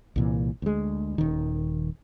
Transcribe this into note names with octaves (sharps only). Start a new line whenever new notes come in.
C2 A#2 E3
D2 G#3
D#1 D#3